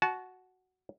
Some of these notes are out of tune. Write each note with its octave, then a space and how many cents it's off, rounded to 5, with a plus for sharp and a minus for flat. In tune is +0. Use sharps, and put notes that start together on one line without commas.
F#4 +0 A5 -30